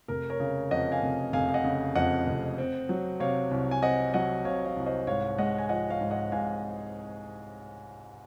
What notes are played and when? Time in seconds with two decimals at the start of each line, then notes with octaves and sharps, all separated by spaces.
0.08 F1 A#4
0.29 A#4 C#5
0.40 C#3
0.71 F2 D#5 F#5
0.92 F5 G#5
1.02 F1
1.33 F1 F5 G#5
1.49 F5
1.54 D#5 F#5
1.65 C#3
1.95 F2 D#5 F#5
2.27 F1
2.58 C4
2.89 F#3
3.20 C3 C#5 F5
3.51 C2
3.71 G#5
3.82 C4 D#5 F#5
4.14 F#3 D#5 F#5
4.45 C3 C#5 F5
4.66 C#5 F5
4.77 C2
4.86 C5 D#5
5.07 G#2 C#5 F5
5.38 G#3 D#5 F#5
5.58 G#5
5.69 F3 D#5 F#5
5.90 C#5 F5
6.01 G#2
6.11 D#5 F#5
6.32 G#2 F5 G#5